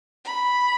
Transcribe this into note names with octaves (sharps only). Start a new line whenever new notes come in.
B5